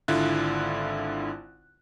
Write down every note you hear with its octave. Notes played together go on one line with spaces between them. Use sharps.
G#1 D3 E4 F4 F#6